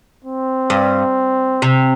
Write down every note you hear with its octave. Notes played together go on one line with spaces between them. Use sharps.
C4
G2
C3